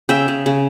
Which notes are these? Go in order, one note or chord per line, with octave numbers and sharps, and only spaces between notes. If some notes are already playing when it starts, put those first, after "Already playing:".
C#3 E5 G5
C#3
C#3